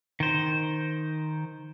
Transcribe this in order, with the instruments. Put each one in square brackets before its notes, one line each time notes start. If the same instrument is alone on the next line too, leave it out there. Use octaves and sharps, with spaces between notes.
[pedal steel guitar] D#3 C5